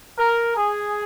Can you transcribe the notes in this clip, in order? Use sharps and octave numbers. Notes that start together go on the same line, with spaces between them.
A#4
G#4